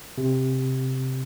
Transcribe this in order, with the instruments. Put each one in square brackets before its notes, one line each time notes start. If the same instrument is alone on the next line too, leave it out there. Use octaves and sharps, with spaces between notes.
[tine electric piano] C3